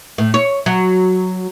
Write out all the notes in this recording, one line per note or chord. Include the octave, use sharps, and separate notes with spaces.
A2
C#5
F#3